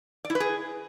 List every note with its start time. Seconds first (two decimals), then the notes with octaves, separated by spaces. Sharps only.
0.25 D5
0.30 E4
0.35 B4
0.40 G#4